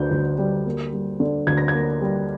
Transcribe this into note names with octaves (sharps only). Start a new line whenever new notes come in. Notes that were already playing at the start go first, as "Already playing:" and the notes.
Already playing: D2 D3 G6
D2
G3
A#3
G3
D3
D2 G#6
A#6
G#6
A#3
G3